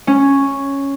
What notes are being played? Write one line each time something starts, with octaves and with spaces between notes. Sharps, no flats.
C#4